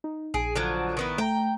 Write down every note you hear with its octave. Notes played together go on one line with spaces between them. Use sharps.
D#4
A#1 G#4 D7
D3 F3 F#3
D#3 B3 E4
A3 G5 A#5